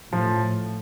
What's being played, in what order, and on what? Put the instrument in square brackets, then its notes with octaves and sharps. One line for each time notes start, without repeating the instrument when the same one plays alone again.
[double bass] A2 [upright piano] F3